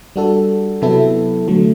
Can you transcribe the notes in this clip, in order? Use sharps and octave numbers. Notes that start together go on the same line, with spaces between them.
G3 D4 F#4 A4
C3 F#3 B3 E4 A4
D3 F#3 A3